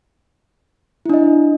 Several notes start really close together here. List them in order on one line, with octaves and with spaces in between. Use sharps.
E4 D4 D#5